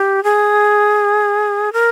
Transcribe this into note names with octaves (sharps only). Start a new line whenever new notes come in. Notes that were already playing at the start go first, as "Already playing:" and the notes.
Already playing: G4
G#4
A#4